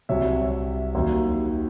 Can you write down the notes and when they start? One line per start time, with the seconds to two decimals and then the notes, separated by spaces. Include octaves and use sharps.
0.09 C2 C3 F#3 C#5 E5
0.95 D#2 D#3 F#3